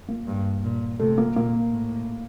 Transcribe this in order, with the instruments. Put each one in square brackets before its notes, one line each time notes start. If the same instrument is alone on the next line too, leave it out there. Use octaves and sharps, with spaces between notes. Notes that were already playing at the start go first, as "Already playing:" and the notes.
[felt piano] A#3
[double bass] G2
A#2
[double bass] C3 [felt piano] A3
[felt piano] A#3
[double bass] A#2 [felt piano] A#3
[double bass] A2